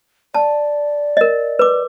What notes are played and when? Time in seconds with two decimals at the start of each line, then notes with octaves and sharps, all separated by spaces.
0.34 D5 A5
1.17 A#4 D#5
1.59 B4 D6